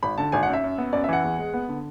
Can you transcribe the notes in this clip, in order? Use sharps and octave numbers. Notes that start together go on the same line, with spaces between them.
G#1 B5
D3 A5
G#1 G#5
F#5
F#2
E5
F#2
B3
F#2 D5
E5
E3 F#5
E2
G#3
B3
D3